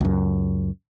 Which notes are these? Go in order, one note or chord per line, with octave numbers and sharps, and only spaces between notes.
C#2 F#2